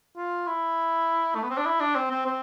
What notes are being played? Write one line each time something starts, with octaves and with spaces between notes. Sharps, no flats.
F4
E4
A3
B3
C4
D4
E4
D4
C4
C4
C4